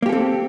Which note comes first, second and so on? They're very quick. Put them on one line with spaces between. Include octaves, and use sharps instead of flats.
A#3 G4 A4 C4